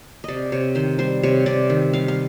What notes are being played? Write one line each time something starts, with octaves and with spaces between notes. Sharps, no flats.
C3 D5 D#5
C3 C#5
D#3 C5
G3 C5
C3 C#5
C3 D5
D#3
G3 F5
F5